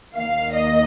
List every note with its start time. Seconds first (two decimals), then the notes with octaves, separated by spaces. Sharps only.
0.14 D#2 D#3 A#3 F5
0.53 D#5